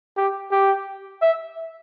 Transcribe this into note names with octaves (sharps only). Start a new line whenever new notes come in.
G4
G4
E5